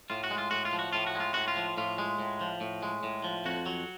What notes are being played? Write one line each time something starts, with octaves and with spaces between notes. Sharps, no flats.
A2 F4
F#4
G#3
F4
A2 F#4
F4
F3
F#4
A2 F4
F#4
G#3 F4
A2 F#4
F4
F3
A2 F4
G#3
A2
F3
A2
G#3
A2
F3
F2 F#4
F#3